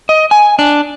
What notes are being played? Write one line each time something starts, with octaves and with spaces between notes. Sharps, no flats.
D#5
G#5
D4